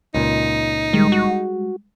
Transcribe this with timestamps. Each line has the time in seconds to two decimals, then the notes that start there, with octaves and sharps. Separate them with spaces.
0.15 C#2 A#2 D#4
0.93 D#3 G3 G#3
1.12 F#4